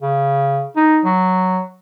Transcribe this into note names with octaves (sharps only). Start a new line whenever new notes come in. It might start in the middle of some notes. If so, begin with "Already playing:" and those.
C#3
D#4
F#3